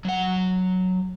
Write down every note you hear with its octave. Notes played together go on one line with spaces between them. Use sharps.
F#3 F#5